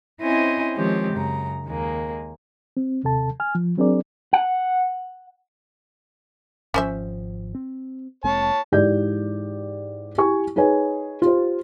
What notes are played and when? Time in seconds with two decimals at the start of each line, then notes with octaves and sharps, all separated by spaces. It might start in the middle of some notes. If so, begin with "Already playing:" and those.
0.22 C4 C#4 E4 C5 D#5 G#5
0.77 D#3 F3 G#3 C4 G4 C#5
1.13 F#2 C#3 A#5
1.66 D#2 G#3 A#3
2.77 C4
3.03 D#2 C3 A4 A5
3.40 G#5 F6
3.55 F3
3.77 F#3 C4 D4 G#4 A#4 D5
4.33 F#5
6.74 G#1 F3 C#4 C5 E5
7.55 C4
8.24 F1 G#3 C4 C#5 A5
8.72 G#2 E3 G4 D5 G6
10.18 E4 G4 G#5 C#6
10.56 D#4 G#4 B4 C#5 G#5
11.22 F4 G4 C5